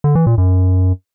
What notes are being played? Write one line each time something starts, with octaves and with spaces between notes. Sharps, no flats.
D3
E3
A#2
F#2